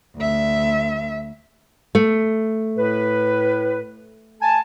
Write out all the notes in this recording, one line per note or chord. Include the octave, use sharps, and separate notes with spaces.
D2 E5
A3
A2 B4
G#5 A5